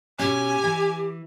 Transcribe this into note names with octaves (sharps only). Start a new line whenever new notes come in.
B2 C#4 G4 G#5
E3